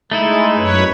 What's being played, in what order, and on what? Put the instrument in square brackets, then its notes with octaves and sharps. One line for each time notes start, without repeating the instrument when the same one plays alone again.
[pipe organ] G#3 [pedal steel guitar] A3 D#4 E4
[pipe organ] F#2 B4 C#5